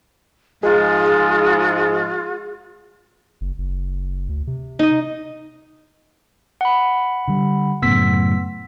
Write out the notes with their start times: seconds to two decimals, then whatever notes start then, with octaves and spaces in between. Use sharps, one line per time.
0.63 G#2 F3 G#3 F4 G#4
3.41 F#1
3.58 F#1
4.29 D2
4.47 C3
4.79 D#4 D#5
6.61 F#5 B5
7.28 D3 G3
7.82 F#2 A2 C#3 B3 E6 B6